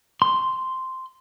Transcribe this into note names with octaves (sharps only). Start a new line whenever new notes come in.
C6